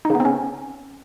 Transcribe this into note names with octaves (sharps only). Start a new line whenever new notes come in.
D#4
C#3
B3
C4
C#4